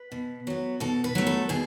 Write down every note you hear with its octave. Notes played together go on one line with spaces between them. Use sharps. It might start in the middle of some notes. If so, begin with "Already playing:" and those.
Already playing: B4
B2
F#3 B3
B2 A4
B4
F#3 A3
A4
B2 G#4